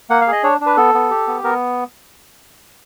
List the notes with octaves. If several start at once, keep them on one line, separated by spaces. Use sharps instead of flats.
A#3 F#5
F5
G#4
D#5
D4 C#5
D4
B4
B3 A4
B3
G4
B3
B3 A#4